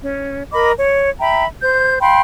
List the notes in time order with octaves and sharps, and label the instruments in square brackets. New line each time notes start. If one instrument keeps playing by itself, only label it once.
[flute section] C#4
A#4 D#5 B5 D6
C#5
E5 G5 A#5 B5
C5 G6
F5 G5 B5 C6